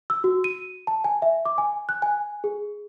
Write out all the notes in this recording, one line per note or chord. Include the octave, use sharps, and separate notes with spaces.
E6
F#4
D#7
A5
G#5
E5
D6
G#5
F#6
G#5
G#4